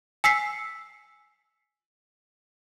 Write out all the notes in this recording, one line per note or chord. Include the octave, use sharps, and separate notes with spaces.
G#5 E6 B6 C7